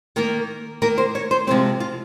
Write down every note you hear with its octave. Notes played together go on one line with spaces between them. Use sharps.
D#3 A#3 A#4
D#3 A#3 A#4
C5
C#5
C5
C3 F3 G#3 C4 C5
F4